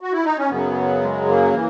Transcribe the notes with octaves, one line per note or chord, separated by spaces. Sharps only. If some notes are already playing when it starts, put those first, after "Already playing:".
F#4
E4
D#4
C#4
F#2 C#3 F#3 B3
G#3
A#3
E3